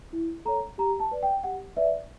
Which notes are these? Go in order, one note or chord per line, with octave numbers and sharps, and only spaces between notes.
E4
A4 C#5 A#5
G4 A#5
A5
B4 D5
G5
G4 F#5
B4 D5 E5